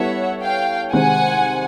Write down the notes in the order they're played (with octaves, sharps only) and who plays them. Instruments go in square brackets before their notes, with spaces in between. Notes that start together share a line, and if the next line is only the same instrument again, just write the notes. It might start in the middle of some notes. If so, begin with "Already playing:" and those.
Already playing: [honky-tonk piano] G3 B3 E4 A4 C#5 [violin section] E5 F#5
[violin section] F5 G5
[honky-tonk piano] C3 D#3 G#3 C4 [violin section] F#5 G#5